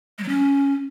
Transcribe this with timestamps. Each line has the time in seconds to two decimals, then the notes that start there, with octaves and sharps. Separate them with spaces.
0.18 G#3
0.23 F#3
0.28 C#4